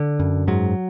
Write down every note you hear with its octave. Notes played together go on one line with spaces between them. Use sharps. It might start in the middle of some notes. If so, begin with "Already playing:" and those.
Already playing: D3
F#2
G#2 F#3